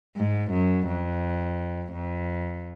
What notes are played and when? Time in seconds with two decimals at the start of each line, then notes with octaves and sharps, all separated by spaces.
0.17 G#2
0.52 F#2
0.88 F2
1.93 F2